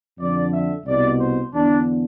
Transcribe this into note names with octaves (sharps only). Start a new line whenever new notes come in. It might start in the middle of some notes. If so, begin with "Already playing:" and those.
F2 D3 D5
E5
C2 B2 D5
C5
E2 D3 D4